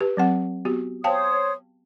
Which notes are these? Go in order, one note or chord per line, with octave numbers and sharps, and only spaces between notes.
G4 B4
F#3 C4 F#5
B3 F#4 G4
C5 C#5 F5 G5 A5 D#6